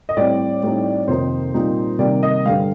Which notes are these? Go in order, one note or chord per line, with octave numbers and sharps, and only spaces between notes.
D#5
A2 G3 C4 D5
A2 G3 C4 D#4
F2 C3 D#3 A#3 D#4 C5
A#2 G3 C4 D#4
C3 D#3 G3 A#3 D#4 D5
D#5
G2 D3 G3 F5